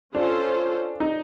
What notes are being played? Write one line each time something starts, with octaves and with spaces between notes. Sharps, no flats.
C#4 D4 F4 A4 C5
D#4